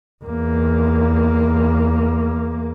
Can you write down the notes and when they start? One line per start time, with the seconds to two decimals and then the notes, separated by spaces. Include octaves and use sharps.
0.24 E2 A#3